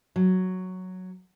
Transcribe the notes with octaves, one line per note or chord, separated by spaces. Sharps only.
F#3